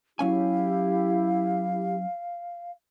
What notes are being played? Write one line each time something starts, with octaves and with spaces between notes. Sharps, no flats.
F#3 C#4 E4 G4 F5 G#5